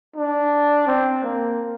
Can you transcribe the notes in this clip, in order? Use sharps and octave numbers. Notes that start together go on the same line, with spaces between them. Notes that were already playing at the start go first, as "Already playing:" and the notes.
D4
C4
A#3